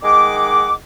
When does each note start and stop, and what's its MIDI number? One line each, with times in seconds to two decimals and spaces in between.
0.03 0.74 51
0.03 0.74 56
0.03 0.74 78
0.03 0.74 86